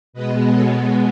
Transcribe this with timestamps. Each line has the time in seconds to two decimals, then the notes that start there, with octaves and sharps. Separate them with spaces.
0.13 B2 G#3 B3 B4 D#5
0.49 A4 C#5